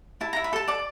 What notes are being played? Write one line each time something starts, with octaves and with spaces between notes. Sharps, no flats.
E4 A5
A#5
E4
B5
A4 A5
D5 A5